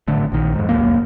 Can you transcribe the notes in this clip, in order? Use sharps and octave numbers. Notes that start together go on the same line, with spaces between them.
G#1 A2 D3 A3
A#1 D#3
F2 G#2
D#1 C#2 F#2 A#3